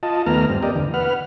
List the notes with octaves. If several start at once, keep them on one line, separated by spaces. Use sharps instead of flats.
F4 D#5 A5
D#2 A3 B3 A#5 F6
G2 C4
A#3 G4 D5 D#5
E2 D3
B4 F#5 F6